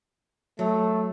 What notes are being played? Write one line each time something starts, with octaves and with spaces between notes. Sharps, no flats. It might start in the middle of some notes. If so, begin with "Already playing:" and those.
F#3 A3